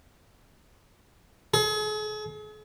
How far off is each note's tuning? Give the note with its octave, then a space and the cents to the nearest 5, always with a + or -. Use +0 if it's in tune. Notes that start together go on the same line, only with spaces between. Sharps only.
G#4 +40